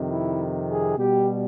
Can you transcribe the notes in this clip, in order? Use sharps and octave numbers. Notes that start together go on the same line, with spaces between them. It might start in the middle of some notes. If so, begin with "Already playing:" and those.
Already playing: F2 C3 D#3
E4
G#4
B2 G3 G4